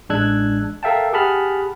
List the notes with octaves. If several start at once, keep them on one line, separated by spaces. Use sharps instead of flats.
A1 G#3 D4 E6 F#6 G#6
A4 A#4 E5 F5 G5 A5
G4 G#4 F#5 A5 B5 F6